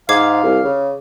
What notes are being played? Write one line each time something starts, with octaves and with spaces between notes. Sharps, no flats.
G#2 F5 D6 G#6 C7
C2
C#3